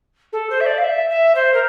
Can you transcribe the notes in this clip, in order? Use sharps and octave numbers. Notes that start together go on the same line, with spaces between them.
A4
C5
E5
D5
F5
E5
E5
C5
A#4